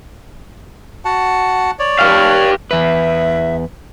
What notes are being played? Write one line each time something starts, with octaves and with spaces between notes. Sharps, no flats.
F#4 F#5 A5
C#5 D5
G4 F5
E2 B4 E5